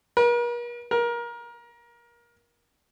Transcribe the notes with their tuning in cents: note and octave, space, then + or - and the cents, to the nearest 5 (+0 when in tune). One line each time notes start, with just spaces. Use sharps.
A#4 +45
A#4 +25